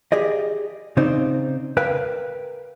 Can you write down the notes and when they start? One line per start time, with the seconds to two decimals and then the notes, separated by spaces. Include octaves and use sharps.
0.12 G4 G#4 D5 D#5
0.97 C#3 C4 D#4 C5 D5
1.77 A#4 B4 F5 G5